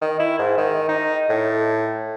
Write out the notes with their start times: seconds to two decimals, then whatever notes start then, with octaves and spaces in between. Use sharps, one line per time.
0.01 D#3
0.20 E4
0.39 G#2
0.57 D#3
0.88 D#4
1.29 A2